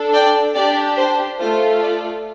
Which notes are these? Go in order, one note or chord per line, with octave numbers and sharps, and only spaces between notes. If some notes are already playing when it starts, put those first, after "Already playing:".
Already playing: D4 A4
D5 G5
D4 G4 D5
C5
A3 F4 A4 C5
D5